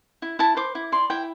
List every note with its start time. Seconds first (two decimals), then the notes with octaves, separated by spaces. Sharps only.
0.22 E4
0.39 E4 A5
0.57 C5 D6
0.75 E4
0.92 D5 C6
1.10 E4 G5